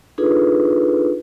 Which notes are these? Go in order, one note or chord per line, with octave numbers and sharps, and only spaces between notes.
D4 D#4 F4 G#4 A4 B4